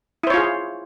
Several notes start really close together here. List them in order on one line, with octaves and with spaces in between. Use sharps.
E4 C5 C#5 F4 G#4